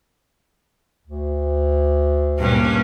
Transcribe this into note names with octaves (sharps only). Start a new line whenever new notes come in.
D2
G2 A#2 C#4